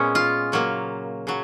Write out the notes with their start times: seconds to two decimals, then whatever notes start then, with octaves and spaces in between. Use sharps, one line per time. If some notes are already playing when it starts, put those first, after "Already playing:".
Already playing: A#2 G#3 B3 C#4
0.15 F4
0.52 C#3 F#3 A#3
1.27 C#3 F#3